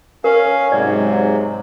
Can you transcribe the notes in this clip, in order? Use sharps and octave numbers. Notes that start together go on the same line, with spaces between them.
C#4 A#4 F5
G#2 C3 F#3 D5